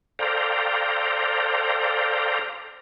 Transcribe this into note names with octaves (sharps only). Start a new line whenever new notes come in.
A4 C5 D5 F5 G5 A#5